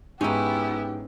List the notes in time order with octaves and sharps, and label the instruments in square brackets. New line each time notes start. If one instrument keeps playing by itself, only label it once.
[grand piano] G#2 [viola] B3 E4 [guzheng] C#4 D#4 [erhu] G4